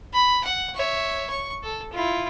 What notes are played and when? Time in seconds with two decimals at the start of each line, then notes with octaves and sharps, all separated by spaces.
0.13 B5
0.44 F#5
0.75 C#5 E5
1.30 C#6
1.63 A4
1.92 E4 F4